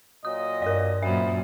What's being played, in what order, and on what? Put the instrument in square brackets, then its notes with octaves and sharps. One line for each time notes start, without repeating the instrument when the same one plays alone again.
[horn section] A#2 F#3 D#5 [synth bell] D#6
[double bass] G2 [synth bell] A#4 D5
[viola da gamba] F#2 A#2 [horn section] C4 D#5 B5 [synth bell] E5